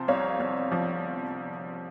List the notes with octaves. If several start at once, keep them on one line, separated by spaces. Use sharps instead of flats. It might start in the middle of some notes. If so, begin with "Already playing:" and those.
Already playing: C3 F3 C5
C2 C#5 F5
C2
F3